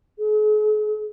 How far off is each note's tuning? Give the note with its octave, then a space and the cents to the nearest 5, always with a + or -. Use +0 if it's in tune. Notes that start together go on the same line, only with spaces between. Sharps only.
G#4 +45